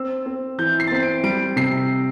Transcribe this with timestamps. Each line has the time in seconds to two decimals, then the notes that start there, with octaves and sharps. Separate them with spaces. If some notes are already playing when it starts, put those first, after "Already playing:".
Already playing: C4 E6
0.26 C4
0.58 E3 G6
0.80 C7
0.87 A6
0.91 C4 C7
1.03 D7
1.23 G3 D7
1.56 C3 C7